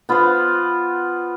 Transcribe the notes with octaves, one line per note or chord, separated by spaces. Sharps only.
B3 F4 C5